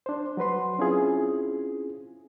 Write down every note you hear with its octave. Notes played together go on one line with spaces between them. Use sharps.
D4 C5
F#3 F#4 B4 C6
C4 C#4 E4 F4 G#4